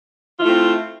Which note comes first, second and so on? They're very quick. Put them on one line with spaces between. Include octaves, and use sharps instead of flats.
F4 E4 A3 C4